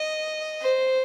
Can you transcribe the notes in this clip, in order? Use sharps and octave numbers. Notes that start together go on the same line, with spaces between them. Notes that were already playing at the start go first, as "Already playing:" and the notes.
Already playing: D#5
C5